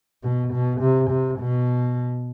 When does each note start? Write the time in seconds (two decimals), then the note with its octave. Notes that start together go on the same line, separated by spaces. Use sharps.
0.23 B2
0.53 B2
0.81 C3
1.10 C3
1.39 B2